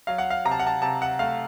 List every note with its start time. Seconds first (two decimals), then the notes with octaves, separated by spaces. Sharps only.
0.07 F#3 F5
0.18 F#5
0.30 F5
0.45 C3 A#5
0.51 A5
0.59 F#5
0.67 A5
0.82 C3 A5
1.02 F#5
1.19 A3 F5